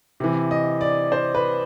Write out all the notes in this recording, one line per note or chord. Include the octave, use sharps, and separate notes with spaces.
C3 E3
D#5
D5
C5
B4